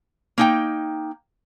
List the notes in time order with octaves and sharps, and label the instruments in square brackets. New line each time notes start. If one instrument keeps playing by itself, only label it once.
[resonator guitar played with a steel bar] A#3 D#4 G5